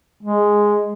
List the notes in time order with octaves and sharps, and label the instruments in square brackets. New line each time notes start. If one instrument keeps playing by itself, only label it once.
[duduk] G#3